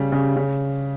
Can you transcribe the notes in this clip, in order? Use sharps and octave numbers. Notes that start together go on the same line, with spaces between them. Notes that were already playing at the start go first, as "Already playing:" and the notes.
Already playing: C#3 G3
C#3
C#3